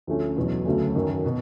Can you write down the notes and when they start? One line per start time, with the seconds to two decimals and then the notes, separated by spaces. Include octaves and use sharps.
0.07 D2 D3 F3 A3 C#4
0.37 E2 B2 F#3
0.65 D2 C#3 F#3 A3 C#4
0.95 F#2 D#3 F#3
1.26 B2